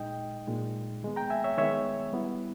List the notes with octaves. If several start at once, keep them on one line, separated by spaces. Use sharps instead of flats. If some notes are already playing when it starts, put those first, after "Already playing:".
Already playing: A#2 G#3 D#4 D#5 G5
A#2 G#3 D#4
D#3 G#3 B3
G5 A#5
E5 G#5
C#5 E5
D#3 G#3 B3 C#5 E5
G3 B3 E4